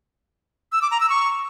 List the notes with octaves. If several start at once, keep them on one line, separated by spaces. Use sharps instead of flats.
E6
D6
A#5
E6
C#6